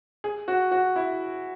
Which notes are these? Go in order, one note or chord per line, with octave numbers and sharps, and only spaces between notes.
G#4
F#4
F#4
E4